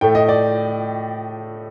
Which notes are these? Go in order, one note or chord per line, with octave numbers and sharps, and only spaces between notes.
A2 A3 G5
D#5
D5